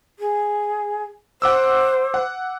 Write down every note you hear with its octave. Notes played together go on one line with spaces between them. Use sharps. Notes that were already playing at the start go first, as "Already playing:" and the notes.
G#4
C5 F#5 D6 E6
F#5